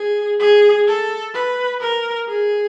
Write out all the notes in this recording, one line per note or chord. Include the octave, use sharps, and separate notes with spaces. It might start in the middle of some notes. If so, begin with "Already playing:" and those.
Already playing: G#4
G#4
A4
B4
A#4
G#4